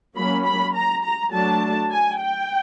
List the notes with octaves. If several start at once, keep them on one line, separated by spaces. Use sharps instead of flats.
F#3 A#3 C#4 B5
B5
A#5
A#5
F#3 A3 D4 A5
G#5
G5